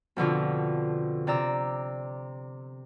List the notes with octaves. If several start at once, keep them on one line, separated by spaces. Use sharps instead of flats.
F2 B2 D3 F4
C3 D5 A#5 E6